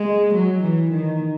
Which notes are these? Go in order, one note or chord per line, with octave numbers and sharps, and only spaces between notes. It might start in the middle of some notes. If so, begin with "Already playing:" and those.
Already playing: G#3
F#3
E3
D#3